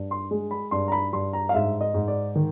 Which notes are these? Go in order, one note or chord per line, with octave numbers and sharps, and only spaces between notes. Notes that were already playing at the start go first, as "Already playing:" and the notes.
Already playing: G2
C6
G#3
B5
G2 C6
A#5
B5
G2 C6
A#5
F5
G#2 E5
D#5
G#2
D5
D#3